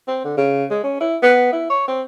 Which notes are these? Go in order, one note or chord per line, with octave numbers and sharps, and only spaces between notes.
C4
D3
C#3
G#3
C#4
E4
B3
E4
C#5
C4